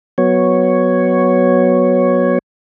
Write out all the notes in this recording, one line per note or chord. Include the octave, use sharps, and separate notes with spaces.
F#3 B3 C#5